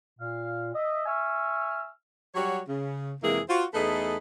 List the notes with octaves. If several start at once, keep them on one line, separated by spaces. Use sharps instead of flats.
A#2 F5
D#5 E5
E5 G#5 C#6 E6 F6
F#3 G3 F#4 C#5
C#3
F2 C3 E3 G#3 A#3 G#4
F4 F#4 C5
E2 A3 D#4 G#4 A4 B4